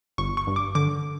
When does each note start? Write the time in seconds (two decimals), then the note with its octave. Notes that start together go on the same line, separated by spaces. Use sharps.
0.18 G1 C#6
0.37 C#6
0.47 G2
0.56 D6
0.75 D3 D6